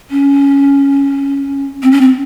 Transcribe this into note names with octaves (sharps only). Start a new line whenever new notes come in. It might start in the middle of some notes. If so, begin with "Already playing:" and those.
C#4
C4
C#4
C4